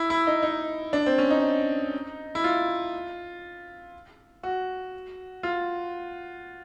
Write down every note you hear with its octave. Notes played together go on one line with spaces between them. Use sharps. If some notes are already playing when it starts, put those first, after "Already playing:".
Already playing: E4
E4
D#4
D#4
D4
C4
C#4
D#4
E4
F4
F#4
F4